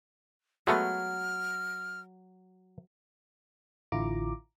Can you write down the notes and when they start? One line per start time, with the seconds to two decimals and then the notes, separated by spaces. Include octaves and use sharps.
0.67 F#3 G#3 A3 B3 F6
3.92 A1 D3 E4 F4 A#5 D6